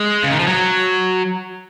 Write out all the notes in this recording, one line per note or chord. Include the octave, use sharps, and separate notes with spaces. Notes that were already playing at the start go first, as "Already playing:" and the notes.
Already playing: G#3
C#3
D#3
F3
F#3